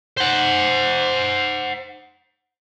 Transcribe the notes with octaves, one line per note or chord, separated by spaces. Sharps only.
C5 F#5